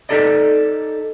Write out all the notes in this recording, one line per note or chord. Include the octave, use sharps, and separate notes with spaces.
D#4 G4 A4 D5 D#5